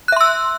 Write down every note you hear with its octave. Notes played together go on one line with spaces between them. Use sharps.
E5 C6 E6 F#6